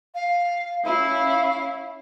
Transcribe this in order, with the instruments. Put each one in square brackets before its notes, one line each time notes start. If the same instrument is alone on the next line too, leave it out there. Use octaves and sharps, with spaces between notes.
[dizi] F5
[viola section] C#4 E4 [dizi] F5